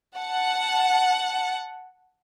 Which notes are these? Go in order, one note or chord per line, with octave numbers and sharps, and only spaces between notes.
F#5 A5